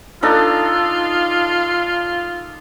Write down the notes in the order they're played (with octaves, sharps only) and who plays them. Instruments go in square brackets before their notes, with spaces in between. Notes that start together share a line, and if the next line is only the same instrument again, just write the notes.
[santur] D4 D#4 A4 [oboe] F4